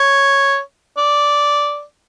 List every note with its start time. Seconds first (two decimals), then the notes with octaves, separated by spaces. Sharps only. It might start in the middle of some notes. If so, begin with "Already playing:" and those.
Already playing: C#5
0.97 D5